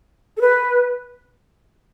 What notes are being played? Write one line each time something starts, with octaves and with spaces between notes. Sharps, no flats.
A4
B4